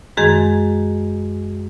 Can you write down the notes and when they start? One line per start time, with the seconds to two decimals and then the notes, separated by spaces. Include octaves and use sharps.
0.17 F#2 D#3 G#3 G#4